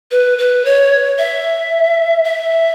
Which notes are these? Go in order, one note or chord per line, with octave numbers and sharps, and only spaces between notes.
B4
B4
C#5
E5
E5